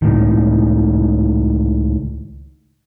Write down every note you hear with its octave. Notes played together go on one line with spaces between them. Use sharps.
C#2 A2 D#3